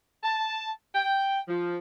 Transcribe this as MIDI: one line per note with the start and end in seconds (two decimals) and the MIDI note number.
0.23 0.70 81
0.94 1.39 79
1.48 1.77 53